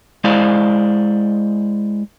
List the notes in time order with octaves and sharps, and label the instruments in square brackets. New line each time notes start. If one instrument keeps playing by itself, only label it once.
[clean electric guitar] G#3 E4 C5 D5 F5